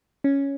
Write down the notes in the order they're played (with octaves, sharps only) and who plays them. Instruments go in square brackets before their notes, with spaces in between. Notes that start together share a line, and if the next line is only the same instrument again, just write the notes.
[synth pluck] C#4